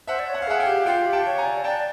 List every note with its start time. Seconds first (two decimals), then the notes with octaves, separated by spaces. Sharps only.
0.07 C5 E5 F#5
0.19 D5
0.27 C#5
0.34 F#5
0.42 F5
0.47 G#4 E5 F#5
0.60 F5 G5
0.67 G4
0.86 F4 F5 G5
1.06 G4
1.13 G5 A5
1.26 C#5
1.38 G#5 A#5
1.46 D5
1.64 D5 G5 A5